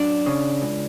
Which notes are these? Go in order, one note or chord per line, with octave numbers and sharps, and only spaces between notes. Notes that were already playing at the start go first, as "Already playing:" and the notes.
Already playing: F#2 D4
C#3
C#2